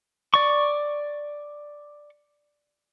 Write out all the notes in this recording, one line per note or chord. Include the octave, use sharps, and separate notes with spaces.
D5 C#6